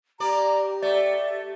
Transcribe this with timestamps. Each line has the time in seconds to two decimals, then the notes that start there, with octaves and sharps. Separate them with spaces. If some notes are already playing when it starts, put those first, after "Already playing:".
0.20 A#3 G4 D5 A#5
0.83 A3 D5 E5